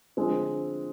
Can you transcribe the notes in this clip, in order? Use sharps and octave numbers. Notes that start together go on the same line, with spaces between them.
D3 F3 G#3 C4